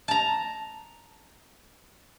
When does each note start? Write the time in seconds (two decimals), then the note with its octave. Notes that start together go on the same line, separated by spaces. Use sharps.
0.08 A5 A#5